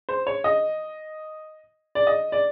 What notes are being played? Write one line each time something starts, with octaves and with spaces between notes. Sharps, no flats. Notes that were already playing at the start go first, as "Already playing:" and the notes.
C5
C#5
D#5
D5
D#5
D5